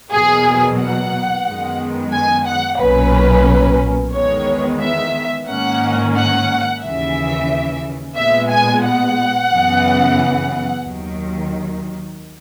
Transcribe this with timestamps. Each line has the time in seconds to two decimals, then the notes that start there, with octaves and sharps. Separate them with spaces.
0.11 E2 B2 F#3 A#3 G#4
0.78 F#5
1.45 F#2 D#3 G#3 B3
2.13 G#5
2.46 F#5
2.79 B1 A#2 F#3 A#3 C#4 B4
4.13 E2 D#3 G#3 B3 C#5
4.81 E5
5.47 G#2 D#3 A#3 C#4 F#5
6.16 F#5
6.82 D#2 C#3 E3 E5
8.16 A#2 G#3 B3 E5
8.50 G#5
8.83 F#5
9.50 F#2 C#3 E3 B3
10.84 D#2 D#3 F#3